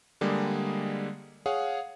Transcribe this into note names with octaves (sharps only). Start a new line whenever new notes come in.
D3 G3 G#3 A#3 G#4
G#4 C#5 F5 F#5